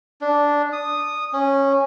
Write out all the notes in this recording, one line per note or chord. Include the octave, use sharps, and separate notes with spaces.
D4
D#6
C#4